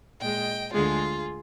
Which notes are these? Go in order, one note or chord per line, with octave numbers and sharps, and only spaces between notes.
A#2 G#3 D#5 G5
D2 D3 G#3 F4 G#4